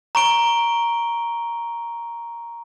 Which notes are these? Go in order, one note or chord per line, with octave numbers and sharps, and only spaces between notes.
A#5 C#6 D7 G7